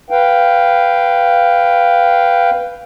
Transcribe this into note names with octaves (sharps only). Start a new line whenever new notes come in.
B4 F5 G5